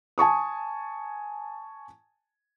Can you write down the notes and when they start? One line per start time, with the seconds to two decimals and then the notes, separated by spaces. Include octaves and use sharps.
0.18 G#5 A5 C#6 D#6